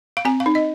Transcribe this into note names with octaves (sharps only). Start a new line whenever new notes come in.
F5
C4 G#5
F5
D#4
D#5